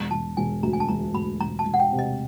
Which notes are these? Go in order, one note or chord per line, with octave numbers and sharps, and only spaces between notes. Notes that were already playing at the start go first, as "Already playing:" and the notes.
Already playing: E1
E1 A5
E1 G#5
D2 A#5
G#5
A5
E1 A#5
D2 B5
E1 A#5
A5
E1
F#5
G5
C3
D#5